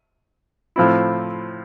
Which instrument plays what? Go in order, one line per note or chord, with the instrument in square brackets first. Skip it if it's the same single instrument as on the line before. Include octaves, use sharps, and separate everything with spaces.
[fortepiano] A2 F3 C4 E4